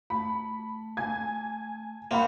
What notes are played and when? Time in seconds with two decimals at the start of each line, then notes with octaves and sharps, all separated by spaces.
0.10 A3 A5 B5
0.97 G#5 G#6
2.11 A#3 C4 F5 F#5 B5